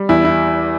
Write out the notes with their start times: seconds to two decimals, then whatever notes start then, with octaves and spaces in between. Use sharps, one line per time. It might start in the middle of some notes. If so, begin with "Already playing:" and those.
Already playing: G3
0.09 E2 E4
0.25 E4